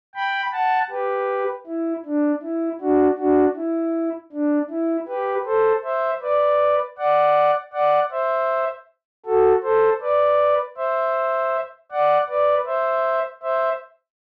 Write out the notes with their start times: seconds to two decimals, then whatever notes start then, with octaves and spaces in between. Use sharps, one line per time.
0.15 G5 B5
0.53 F#5 A5
0.90 G4 B4
1.67 E4
2.05 D4
2.43 E4
2.81 D4 F#4
3.18 D4 F#4
3.57 E4
4.32 D4
4.71 E4
5.08 G4 B4
5.46 A4 C5
5.84 C5 E5
6.22 B4 D5
6.98 D5 F#5
7.73 D5 F#5
8.11 C5 E5
9.26 F#4 A4
9.63 A4 C5
10.01 B4 D5
10.77 C5 E5
11.91 D5 F#5
12.28 B4 D5
12.66 C5 E5
13.43 C5 E5